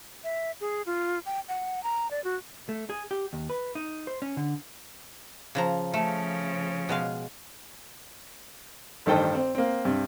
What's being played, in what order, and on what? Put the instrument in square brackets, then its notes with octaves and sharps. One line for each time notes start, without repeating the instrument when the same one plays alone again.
[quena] E5
G#4
F4
G5
F#5
A#5
D5
F#4
[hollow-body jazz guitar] A3
G#4
G4
D#2
B4
D#4
C5
C#4
D3
[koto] C#3 F3 A#5
[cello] C#3 F3 [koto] A3
[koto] B2 G#3 F5
[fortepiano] A1 G2 D#3 A4 C5 G5
C4
A#3 C4
G2 C3